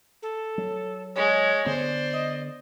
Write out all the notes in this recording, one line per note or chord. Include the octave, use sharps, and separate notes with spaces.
A4
F#3
G#3 C#5
D3 B3 C5 D5
D#5